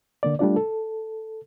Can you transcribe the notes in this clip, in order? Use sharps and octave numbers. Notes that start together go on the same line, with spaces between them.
D3 A#3 D5
G3 A3 D4 F4 D5
A4